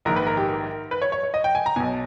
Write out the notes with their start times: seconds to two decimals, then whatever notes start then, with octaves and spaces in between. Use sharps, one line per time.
0.05 A#1 G#2 D#3 A#4
0.16 B4
0.27 A#4
0.37 G4
0.48 A#4
0.91 B4
1.02 C#5
1.12 C#5
1.23 C#5
1.34 D#5
1.44 G5
1.55 G#5
1.66 A#5
1.76 B1 B2 G#5